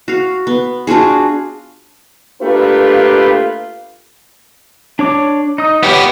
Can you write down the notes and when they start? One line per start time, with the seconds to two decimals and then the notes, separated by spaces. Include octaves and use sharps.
0.08 F#4 F5
0.47 B3
0.87 D4 F4 F#4 G#4
2.42 A3 A#3 D4 F4 G4 B4
4.99 D4 C#5 D6
5.58 D#4 D#6
5.83 B3 G4 B4 C#5